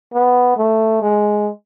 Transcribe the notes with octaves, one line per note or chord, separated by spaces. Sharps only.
B3
A3
G#3